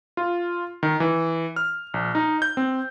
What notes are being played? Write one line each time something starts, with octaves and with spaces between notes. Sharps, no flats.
F4
D#3
E3
F6
A#1
D#4
G6
C4